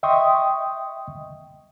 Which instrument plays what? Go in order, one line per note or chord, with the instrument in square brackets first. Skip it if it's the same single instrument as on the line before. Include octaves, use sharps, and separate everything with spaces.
[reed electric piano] D#5 E5 G5 C6 C#6 D#6